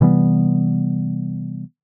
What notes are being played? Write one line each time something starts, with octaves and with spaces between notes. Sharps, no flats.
C3 E3 G3 B3